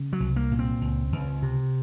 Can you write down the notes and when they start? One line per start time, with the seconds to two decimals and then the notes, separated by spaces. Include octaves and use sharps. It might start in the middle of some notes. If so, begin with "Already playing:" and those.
Already playing: C#3
0.13 F#3
0.20 C2
0.36 A#3
0.52 A#2
0.59 C4
0.81 C#2
1.12 C#2
1.42 C3